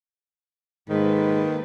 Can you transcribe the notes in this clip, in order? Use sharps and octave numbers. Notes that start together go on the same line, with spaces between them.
G#2 D#3 G#3 A#3 A4 B4